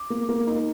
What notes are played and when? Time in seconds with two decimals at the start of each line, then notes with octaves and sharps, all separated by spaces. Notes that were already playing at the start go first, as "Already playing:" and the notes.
Already playing: D6
0.10 A#3
0.29 A#3
0.47 D#4